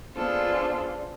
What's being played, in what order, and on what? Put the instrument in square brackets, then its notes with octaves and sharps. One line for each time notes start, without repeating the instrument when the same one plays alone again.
[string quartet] B3 D4 F4 G#4 A4 C5